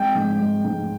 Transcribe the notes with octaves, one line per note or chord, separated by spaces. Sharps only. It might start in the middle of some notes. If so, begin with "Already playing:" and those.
Already playing: G#3 C4 G5
G#2
G#3
G#2